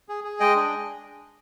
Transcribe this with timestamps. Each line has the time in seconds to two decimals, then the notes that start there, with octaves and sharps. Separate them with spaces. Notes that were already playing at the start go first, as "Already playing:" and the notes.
0.09 G#4
0.24 G#4
0.40 G#3 D#5 G5
0.55 D4